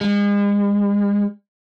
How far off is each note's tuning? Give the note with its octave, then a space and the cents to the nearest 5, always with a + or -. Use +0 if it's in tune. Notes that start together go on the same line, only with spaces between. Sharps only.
G#3 -40